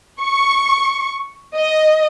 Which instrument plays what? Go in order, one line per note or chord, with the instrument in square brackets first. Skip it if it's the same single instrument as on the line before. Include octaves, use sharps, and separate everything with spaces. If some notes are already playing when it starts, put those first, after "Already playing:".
[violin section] C#6
D#5